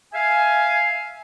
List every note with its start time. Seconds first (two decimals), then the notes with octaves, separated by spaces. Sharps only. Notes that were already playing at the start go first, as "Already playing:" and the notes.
0.13 E5 F5 G#5